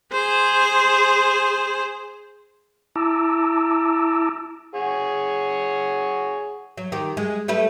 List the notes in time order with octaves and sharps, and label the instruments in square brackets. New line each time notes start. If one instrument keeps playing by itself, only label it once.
[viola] G#4 C5
[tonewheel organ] E4 A5 A#5 D6 E6
[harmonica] G#4 C#5 F#5
[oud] F#3
D#3 G4
G#3
G3 A3 B4